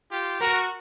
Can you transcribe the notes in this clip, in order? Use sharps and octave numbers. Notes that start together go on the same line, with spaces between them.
F4 G4
F#4 A#4